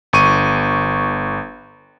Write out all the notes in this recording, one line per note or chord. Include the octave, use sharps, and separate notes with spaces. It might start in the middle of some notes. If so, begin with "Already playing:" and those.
G1 C#6 D#7